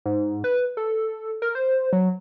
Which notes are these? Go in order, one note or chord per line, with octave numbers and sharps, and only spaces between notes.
G#2
B4
A4
A#4
C5
F#3